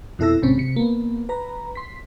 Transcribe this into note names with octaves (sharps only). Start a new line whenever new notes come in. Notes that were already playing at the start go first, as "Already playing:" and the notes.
F2 B2 E4 A4 E6 A#6
A#1 G#2 C3 C4 C#4
C3 C#7
A#3 B3
B4 A#5
C6 B6